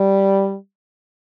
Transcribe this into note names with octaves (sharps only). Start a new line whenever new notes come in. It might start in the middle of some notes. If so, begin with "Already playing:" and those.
Already playing: G3